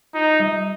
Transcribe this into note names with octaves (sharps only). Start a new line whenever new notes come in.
D#4 F4
G3